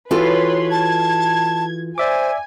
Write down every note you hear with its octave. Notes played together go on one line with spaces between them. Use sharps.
E3 F4 F#4 A4 B4 C#5 C6
A5 G#6
C5 D5 E5 G#5 D6